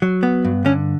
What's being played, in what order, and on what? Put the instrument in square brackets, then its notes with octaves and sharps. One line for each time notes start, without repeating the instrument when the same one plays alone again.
[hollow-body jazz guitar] F#3
B3
G2
D3 C#4